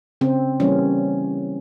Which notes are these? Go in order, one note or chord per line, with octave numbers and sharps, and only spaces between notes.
C#3 C4
E3 G3 A#3 C#4